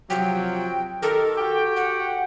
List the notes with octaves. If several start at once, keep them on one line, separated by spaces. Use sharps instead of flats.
C3 F3 F#3 G5
D#3 G4 A4 A#4
F#4 G4 G5
F#5